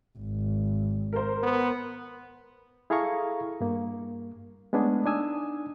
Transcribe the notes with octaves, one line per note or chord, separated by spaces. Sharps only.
G#1
A#4 C5
B3
E4 G#4 A4 F5 A#5 C#6
G2 A#3
G#3 A3 B3 C#4 D4 G#4
D4 D#4 G#5 D#6 E6